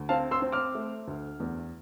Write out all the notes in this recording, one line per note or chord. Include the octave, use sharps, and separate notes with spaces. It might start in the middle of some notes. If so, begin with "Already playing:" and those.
Already playing: D2
C4 F5 A5
C6 E6
C4
D6 F6
A3
D2
E2